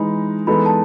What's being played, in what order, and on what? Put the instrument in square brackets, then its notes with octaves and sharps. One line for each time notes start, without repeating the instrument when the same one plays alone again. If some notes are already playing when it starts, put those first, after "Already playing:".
Already playing: [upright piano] E3 G#3 D#4 [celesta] B5
[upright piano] E3 G#3 B3 D#4 A4 [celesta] B5
[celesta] A5